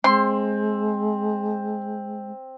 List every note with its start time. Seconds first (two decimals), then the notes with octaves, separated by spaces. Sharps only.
0.04 G#3 C4 C6